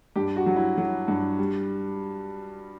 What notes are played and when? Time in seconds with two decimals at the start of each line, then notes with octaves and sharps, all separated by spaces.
0.16 G2 G4
0.36 F#4
0.46 F#3
0.56 E4
0.77 F#3
1.08 G2
1.39 G3